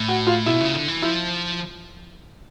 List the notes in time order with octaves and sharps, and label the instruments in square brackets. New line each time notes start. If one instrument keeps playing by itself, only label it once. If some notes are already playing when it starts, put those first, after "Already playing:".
Already playing: [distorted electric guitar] A2
[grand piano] F#4
F4
[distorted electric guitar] B2 [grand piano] E4
[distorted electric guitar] C#3
D3
E3
[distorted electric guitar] F3 [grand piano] E4